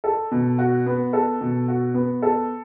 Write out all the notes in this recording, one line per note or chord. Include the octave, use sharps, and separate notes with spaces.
A4
B2
F#4
B3
A4
B2
F#4
B3
A4